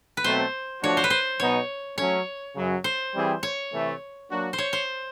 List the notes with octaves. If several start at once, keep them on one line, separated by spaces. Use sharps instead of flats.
B4
B2 F#3 A3 C4 C5
F3 A3 D4 F#4 C#5
C5
B4
C5
B2 F#3 B3 D#4 C#5
F#3 A3 C#4 C#5
F#2 C#3 F#3
C5
E3 G3 C4 E4 G#4
C#5
C3 E3 A3
F#3 A#3 D4 F#4
C5
C#5
C5